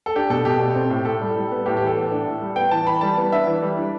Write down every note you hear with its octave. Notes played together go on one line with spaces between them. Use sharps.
A4
D4 G4
B2 A4
B2 G4
A3
C4
A2
A2 A4
G3
G3
B3
A2 G4
E3 G4
A4
B3
D4
A2
G3
B3 G5
E3 A5
E3 B5
G3 A5
B3
D4 E5
E3
G3
D4